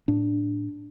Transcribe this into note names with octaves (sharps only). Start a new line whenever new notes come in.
A2 D4